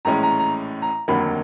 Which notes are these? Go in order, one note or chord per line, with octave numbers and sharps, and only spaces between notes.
A#1 A2 E3 G#3 C#4 A#5
A#5
A#5
A#5
F1 D#2 D3 F#3 A#3 B5